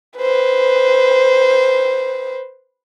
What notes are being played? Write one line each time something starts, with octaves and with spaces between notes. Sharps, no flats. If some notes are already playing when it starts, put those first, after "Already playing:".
B4 C5